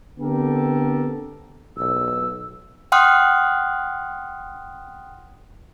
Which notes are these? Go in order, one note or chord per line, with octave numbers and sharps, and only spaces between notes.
D3 B3 C4 G4 A4 A#4
B1 E6
F#5 G5 C6 D#6 F6 F#6